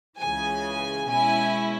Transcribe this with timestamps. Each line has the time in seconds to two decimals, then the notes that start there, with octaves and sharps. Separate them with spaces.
0.19 C#2 C#3 E3 G#5
1.09 B2 G#3 C#4 E4 G#5